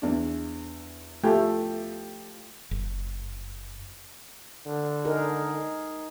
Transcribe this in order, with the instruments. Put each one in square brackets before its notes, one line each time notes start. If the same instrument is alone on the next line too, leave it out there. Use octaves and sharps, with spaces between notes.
[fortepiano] E2 D4
[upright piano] F3 G4 [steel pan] A3
[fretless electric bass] F#1
[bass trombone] D3
[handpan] D#4 G#4 A#4